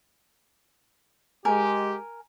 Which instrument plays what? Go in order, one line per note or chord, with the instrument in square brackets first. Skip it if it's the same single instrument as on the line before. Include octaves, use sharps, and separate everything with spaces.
[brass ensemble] G#3 G4 [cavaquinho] A#4 G#5